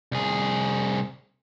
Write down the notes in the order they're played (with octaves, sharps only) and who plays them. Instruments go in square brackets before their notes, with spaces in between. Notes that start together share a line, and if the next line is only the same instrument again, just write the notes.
[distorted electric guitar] C2 G#4